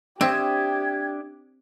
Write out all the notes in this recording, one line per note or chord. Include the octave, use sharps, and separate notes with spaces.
C4 D4 G4 E5 D#6 G#6